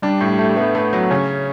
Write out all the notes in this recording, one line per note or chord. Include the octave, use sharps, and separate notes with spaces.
G3 D4
A2
A3
A3 B3
A3
F#3
C#3 C#4